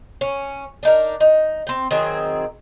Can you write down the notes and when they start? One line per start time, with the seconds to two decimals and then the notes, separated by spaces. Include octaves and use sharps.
0.21 C#4
0.83 D4 D#4 A#4
1.20 D#4
1.67 C4 G5
1.91 D#3 F#3 C4 G#4